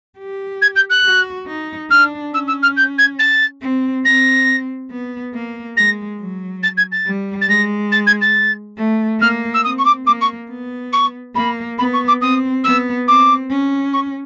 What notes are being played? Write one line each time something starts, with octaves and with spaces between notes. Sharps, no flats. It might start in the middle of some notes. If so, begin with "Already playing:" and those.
G4
G#6
G6
F#6
F#4
D#4
D4 F6
C#4 E6
E6
F6
G6
G#6
A6
C4
C4 A#6
B3
A#3
G#3 A#6
F#3
A6
G#6
A6
G3
A6
G#3 A#6
A6
G#6
A6
A3
A#3 F6
E6
C4 D#6
C#6
D6
A#3 D6
C#6
B3
C#6
A#3 B5
B3 B5
C#6
D6
C4 D#6
B3 E6
C4 D6
C#4
C#6